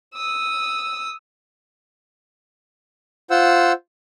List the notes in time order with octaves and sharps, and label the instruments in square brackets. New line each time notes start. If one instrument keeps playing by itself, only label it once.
[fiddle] D#6 E6
[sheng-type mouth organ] F4 C5 F#5 E6